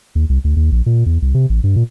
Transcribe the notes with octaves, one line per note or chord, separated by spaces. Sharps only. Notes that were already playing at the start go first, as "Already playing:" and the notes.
D#2
C2
D2
D#2
A#1
A#2
E2
C2
C3
A1
G2
A#2